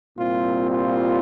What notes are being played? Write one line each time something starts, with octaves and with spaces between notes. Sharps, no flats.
C2 A#2 G3 C4 F4
F4